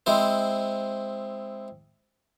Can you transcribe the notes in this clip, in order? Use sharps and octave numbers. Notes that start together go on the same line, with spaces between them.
G#3 C4 E4 C5